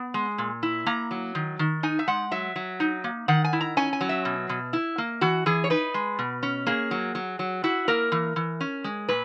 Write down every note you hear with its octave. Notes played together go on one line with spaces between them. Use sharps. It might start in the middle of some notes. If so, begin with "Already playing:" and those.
Already playing: B3
G#3
A#2
E4
A#3 A#5
F#3
D#3
D#3
D#4 G#5
E5
G#3 F#5
F#3 E5
F#3
D#4
A#3
D#3 F#5
G#5
E4
A#5
C#4 G#5
G#5
F#3
E5
B2
B2
E4
A#3
E3 F#4
E3 G#4
C#5
D#4 B4
G#3
B2
C#4
A#3 G#4
F#3
F#3
F#3
E4 F#4
A#3 A#4
E3
E3
C#4
G#3
A#2 B4